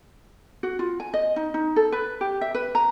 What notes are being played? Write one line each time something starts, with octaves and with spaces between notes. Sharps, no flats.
F#4
F4
G#5
D#5
D#4
D#4
A4
B4
G4
E5
B4
A#5